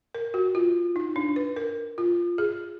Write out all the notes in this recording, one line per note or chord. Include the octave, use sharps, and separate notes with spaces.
A#4
F#4
F4
D#4
D4
B4
A#4
F4
G#4